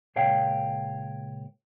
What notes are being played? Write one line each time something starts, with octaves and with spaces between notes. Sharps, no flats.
C#2 A#2 C#5 F5 G5